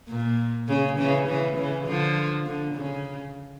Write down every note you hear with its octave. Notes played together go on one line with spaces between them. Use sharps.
A#2
C#3
C#3 E3
C#3 E3
C#3 E3
D3 F3
D3
C#3